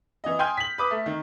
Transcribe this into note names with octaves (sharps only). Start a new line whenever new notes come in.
E3 D#5
G5 G#5 C6 D#6 F6 G6
B6 F#7
B4 D6 D#6
A3
D#3